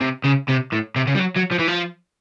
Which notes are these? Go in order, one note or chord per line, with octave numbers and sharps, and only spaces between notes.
C3
C#3
C3
A2
C3
C#3
G3
F#3
F#3
F3
E3
F3